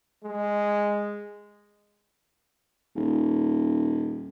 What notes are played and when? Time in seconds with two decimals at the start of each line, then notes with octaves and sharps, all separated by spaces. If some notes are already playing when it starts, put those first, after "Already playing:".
0.24 G#3
2.96 D#1